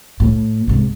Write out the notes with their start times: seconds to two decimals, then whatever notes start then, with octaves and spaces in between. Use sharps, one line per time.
0.20 A2
0.68 G#2 C3